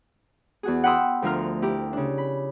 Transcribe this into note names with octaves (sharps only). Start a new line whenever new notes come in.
E2 F#4 G#4
F#5 G5 B5 C6 D#6 E6
D2 F3 A3 F4 A#4 F6
E4 G4 A#4
C#3 D4
B5